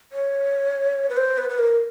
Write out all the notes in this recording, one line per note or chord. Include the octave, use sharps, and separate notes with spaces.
C#5
B4
C5
B4
B4
A#4